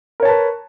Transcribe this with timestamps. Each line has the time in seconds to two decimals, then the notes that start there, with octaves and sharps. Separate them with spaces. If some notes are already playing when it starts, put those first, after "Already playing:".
0.20 A#4
0.23 C#5
0.25 A5
0.28 B4